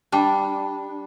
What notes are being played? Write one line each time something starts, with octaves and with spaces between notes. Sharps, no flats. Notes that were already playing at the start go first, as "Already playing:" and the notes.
G3 D4